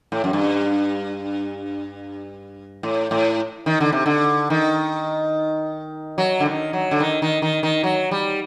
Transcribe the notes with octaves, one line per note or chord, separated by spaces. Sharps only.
A2
F#2
G2
A2
A2
D#3
D3
C3
D3
D#3
F#3
D3
D#3
F#3
D3
D#3
D#3
D#3
D#3
F#3
G3